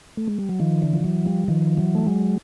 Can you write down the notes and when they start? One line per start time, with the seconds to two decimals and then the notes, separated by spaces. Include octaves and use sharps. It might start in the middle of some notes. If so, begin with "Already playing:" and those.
0.17 A3
0.27 G#3
0.38 G3
0.49 F#3
0.60 D#3 F3
0.82 D3 E3
0.93 F3
1.04 E3 F#3
1.26 F3 G3
1.48 D#3 F3
1.77 E3 F#3
1.95 A3
2.07 F#3 G#3